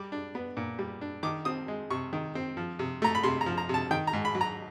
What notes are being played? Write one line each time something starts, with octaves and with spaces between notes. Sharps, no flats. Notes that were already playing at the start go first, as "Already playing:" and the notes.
Already playing: G3 D6
D4
B3
A#2
G3
D4
D#3 D6
C4 D#6
G#3
C3 C#6
D#3
C4
F3
C3
A3 A#5
B5
C3 C6
A#5
F3
A#5
C3 A5
D#3 G5
A#5
G#2
B5
F#3
A#5